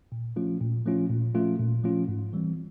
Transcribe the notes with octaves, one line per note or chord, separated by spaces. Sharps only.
A#2
F3 A3 C#4 F4
A#2
F3 A3 C#4 F4
A#2
F3 A3 C#4 F4
A#2
F3 A3 C#4 F4
G#2
E3 G3 C4